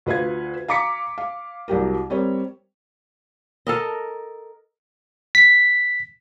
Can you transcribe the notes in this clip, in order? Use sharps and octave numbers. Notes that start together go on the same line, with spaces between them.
D2 F4 B4 F5 G#6
F5 A#5 D6 B6 C#7
F5
C2 F#3 G4 A#4
G3 C4 A#4 C#5
A4 A#4 D#5
B6